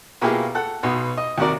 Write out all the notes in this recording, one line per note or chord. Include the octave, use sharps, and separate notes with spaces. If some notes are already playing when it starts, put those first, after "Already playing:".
B2 A#3 E4 F4 G4 G#4
A4 F#5
B1 B2
D#5
D#2 C3 F#4 A#4 D5